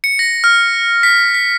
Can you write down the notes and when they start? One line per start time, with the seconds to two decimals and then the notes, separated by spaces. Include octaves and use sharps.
0.04 C#7
0.19 A#6
0.44 F6
1.03 B6
1.34 B6